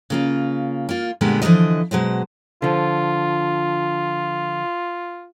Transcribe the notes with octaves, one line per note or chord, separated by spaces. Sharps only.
C#3 A#3 F4
A#3 F4
A#2 D3 G3 G#3 B3
D3 E3 F3 A3 A#3 D#5
B2 F#3 G#3 C5
D3 F3 F4